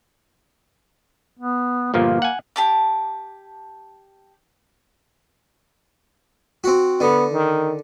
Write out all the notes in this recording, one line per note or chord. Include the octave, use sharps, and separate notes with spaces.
B3
G1 A#2 F3 A#3
F#5 G#5
G4 A5 D6
C4 F#4
D3 B3
D#3